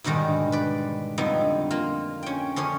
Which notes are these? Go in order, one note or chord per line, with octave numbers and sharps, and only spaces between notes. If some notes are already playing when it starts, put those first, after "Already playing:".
G#2 B2 D3 D#3 G3
B4 D5
F2 D3 G3 B3 D#4
A#3 F4
C#4 G5
D3 F3 C#4 C#5